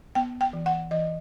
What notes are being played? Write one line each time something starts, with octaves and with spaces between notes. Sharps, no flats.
B3 G5
G5
E3
F#5
E3 D#5